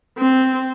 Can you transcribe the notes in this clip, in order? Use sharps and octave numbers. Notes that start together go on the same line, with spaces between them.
C4